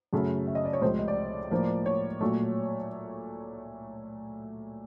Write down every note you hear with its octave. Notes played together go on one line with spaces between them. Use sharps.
F#2 C#3 F#3 A3
E5
D#5
D5
C#5
C#2 C3 F3 A3 C5
D#5
D5
A2 F3 A#3
C#5
A#2 F#3 A3